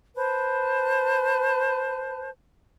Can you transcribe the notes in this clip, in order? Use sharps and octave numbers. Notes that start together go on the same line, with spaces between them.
B4 C5 A5